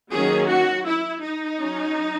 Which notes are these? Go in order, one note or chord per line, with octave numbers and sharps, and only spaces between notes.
D#3 F#3 A#3 C#4 G#4
F#4
E4
D#4
F#3 C#4